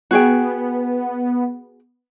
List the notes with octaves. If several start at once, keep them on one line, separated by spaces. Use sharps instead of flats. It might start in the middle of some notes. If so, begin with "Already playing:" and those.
B3 F#4 G#4 G5